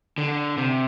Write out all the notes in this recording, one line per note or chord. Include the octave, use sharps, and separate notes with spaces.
D3
C3